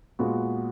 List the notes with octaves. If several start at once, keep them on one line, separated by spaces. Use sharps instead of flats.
A#2 G#3 B3 F#4